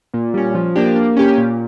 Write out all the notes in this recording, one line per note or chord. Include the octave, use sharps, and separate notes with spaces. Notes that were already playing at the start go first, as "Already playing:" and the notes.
A#2
G3 C#4
F3
A#3 D4 G4
A#3
C#4 G4
A#2